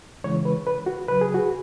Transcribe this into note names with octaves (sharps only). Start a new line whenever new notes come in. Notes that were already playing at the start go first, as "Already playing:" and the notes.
C#3 E3 G#3 C#5
B4
B4
F#4
C#3 F#3 B4
G#4
F#4